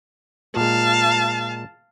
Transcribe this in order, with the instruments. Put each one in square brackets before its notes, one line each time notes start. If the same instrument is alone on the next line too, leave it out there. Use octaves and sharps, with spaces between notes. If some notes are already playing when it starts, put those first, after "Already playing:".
[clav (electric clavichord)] A#2 G#3 [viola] F5 [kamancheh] A5